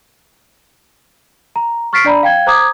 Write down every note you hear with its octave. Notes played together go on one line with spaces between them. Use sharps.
A#5
C#6 F6 A6 B6 C7 D7
D4 D5 A#5 B5
F5 G5 G#6
C5 A#5 D6 D#6 G#6